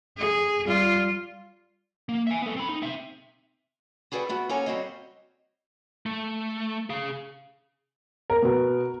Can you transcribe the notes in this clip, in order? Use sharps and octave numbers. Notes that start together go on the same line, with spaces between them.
G#4
G3 F4
A#3
E5 G#5
B3 A4
C4 B5
D#4
C4 E5
F#4 G#4 A4 B4 D5 G5
A3 B3 F#4
A#3 C#4 A4 C#5 G#5 A#5
G3 C4 F#4 C5 C#5 D#5
A3
G#4 F5
A#4
B2 B3 F#4